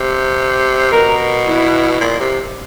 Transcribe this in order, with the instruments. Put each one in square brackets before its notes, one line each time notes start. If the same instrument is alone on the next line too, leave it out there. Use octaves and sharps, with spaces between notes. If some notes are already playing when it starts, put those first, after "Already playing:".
Already playing: [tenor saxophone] C3
[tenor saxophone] B2 [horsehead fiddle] A#4
[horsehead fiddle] E4
[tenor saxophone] A#2
C3